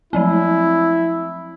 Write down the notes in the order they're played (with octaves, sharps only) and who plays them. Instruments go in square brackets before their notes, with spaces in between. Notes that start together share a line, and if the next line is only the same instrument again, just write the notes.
[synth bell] F3 F#3 C4 [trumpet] E4